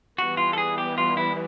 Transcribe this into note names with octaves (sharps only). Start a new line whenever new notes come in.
E3 G3 B3 F#4
F4
A4
G#4
G4
F4
E4